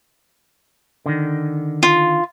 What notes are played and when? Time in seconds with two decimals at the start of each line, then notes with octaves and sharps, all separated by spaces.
1.06 D3 D#3
1.83 F4